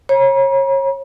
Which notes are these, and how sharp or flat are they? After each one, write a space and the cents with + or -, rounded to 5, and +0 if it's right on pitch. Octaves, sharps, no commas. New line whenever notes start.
C#5 -30 A#5 +45